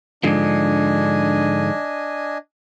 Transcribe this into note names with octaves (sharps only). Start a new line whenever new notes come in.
G#2 D3 F3 D4 D#5 G#5